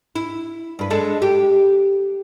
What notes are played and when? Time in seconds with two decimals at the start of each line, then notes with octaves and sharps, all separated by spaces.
0.16 E4
0.79 G2 B4
0.90 G#3 D4 A4
1.22 G4